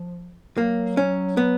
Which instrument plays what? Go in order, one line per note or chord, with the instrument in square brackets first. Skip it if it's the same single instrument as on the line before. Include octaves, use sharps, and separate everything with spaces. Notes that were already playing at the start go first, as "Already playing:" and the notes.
Already playing: [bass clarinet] F3
[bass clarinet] F#3 [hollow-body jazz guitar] A#3
[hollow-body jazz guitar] C#4
B3